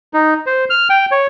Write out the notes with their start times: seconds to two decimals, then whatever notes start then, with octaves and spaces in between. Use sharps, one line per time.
0.14 D#4
0.46 C5
0.70 F6
0.90 G5
1.12 C#5